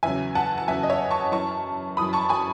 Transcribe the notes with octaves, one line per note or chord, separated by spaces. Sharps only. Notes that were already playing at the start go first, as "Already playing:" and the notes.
E2 C#3 F#3 E5 G#5
F#5 A5
A5
E2 C#3 F#3 E5 G#5
D#5
C#5 E5
A5 C#6
F#2 E3 A5 C#6
F#2 E3 B5 D#6
A5 C#6
G#5 B5